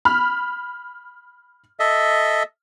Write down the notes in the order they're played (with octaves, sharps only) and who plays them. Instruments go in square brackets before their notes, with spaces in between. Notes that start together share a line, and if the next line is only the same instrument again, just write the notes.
[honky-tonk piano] B5 F6
[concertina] A4 D#5 E5